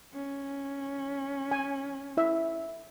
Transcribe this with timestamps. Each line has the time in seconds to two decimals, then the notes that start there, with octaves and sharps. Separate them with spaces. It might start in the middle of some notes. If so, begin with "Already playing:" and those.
0.13 C#4
1.51 G#5
2.17 E4 E5